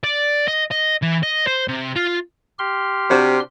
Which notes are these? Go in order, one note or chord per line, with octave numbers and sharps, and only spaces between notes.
D5
D#5
D#5
E3
D#5
C5
C3
F4
G4 C6 F6
C3 D4 F#4 C5